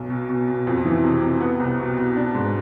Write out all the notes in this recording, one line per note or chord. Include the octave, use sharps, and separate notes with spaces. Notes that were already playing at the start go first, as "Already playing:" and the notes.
Already playing: B1
B2
B2
B2
F2
E3
C3
C3
B3
C2
B2
B2
D4
G#2